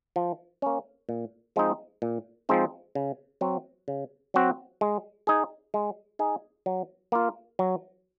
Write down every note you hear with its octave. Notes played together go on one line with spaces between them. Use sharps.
F3
A#3 C#4
A#2
F3 G#3 C4 D#4
A#2
F3 G#3 C4 D#4
C#3
F#3 C4 F#4
C#3
F#3 C4 F#4
G#3
D#4 G#4
G#3
D#4 G#4
F#3
A#3 F4
F#3